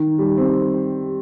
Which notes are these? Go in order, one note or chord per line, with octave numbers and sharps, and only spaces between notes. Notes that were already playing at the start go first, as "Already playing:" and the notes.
Already playing: D#3
G3
C4